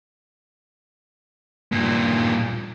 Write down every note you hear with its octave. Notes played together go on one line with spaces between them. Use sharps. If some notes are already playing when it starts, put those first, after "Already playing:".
G2 A#2